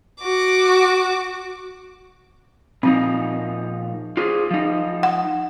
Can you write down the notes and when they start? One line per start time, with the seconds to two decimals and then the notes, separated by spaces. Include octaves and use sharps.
0.22 F#4 D6
2.83 A#2 F3 C4 D#4
4.17 F4 G#4 C5
4.51 F3 D#4
5.03 F#5